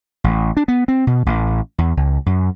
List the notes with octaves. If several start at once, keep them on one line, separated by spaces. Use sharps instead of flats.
A1
D4
B3
C4
B2
A1
E2
C#2
F#2